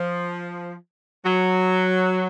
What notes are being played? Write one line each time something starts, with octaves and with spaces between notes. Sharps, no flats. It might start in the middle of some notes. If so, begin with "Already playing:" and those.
Already playing: F3
F#3